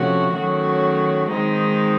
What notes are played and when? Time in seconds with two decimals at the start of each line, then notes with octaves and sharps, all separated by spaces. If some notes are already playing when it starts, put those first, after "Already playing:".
Already playing: C3 F3 A3 C#4 F#4
0.35 D#3 F#3 A3 C#4 F#4
1.31 D#3 G#3 C4 D#4